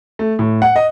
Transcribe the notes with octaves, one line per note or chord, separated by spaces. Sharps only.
A3
A2
F#5
D#5